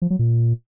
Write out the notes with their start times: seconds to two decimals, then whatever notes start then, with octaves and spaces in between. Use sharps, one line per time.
0.02 F3
0.10 F#3
0.19 A#2